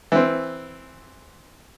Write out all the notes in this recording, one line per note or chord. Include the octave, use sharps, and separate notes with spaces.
E3 C4